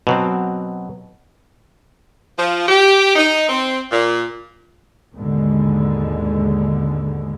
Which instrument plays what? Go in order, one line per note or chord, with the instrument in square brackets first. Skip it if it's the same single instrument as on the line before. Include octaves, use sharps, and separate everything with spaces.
[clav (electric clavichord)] B2 F#3 C4
[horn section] F3
G4
D#4
C4
A#2
[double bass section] D#2 G#2 B2 D3 G#3